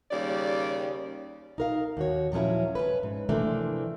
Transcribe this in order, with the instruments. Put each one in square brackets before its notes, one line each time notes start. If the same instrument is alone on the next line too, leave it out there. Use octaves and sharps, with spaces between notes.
[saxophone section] D#2 C#3 G3 D5
[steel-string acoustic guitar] D#4 A#4 F5
D#2 F#4 C#5
A#2 F3 F#3 C#4 E4
C#4 B4
G#2
C3 E3 F3 A3 A#3 D4